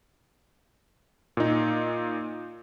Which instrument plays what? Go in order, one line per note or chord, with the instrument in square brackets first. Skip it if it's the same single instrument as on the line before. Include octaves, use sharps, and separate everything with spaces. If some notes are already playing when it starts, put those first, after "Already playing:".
[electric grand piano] A#2 D#4